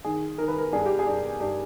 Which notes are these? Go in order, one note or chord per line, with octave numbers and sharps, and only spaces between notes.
D#3 G#4
D#3 A#4
B4
A#4
G2 G#4
G4
G#4
G2
G2 G4